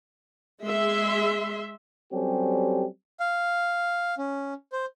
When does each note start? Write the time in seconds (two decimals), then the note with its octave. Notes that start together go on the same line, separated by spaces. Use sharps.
0.64 G#3 G#4 E5 C6
2.13 F#3 G3 C4 C#4 G4 A4
3.20 F5
4.18 C#4
4.72 C5